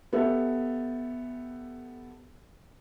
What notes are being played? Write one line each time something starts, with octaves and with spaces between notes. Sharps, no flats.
B3 G4 A4 E5